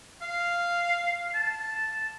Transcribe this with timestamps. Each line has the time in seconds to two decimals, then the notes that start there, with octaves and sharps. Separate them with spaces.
0.22 F5
1.34 A5